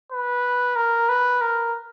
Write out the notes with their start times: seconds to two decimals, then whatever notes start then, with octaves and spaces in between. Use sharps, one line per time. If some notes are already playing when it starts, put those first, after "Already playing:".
0.12 B4
0.76 A#4
1.09 B4
1.41 A#4